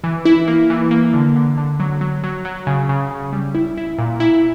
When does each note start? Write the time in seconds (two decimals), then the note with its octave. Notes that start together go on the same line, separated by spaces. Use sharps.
0.04 E3
0.25 E4
0.48 A#3
0.70 E3
0.91 A#3
1.14 D3
1.36 D3
1.58 D3
1.80 F#3
2.01 F#3
2.23 F#3
2.45 F#3
2.67 C#3
2.89 C#3
3.11 C#3
3.33 G3
3.55 E4
3.77 E4
3.99 A#2
4.20 E4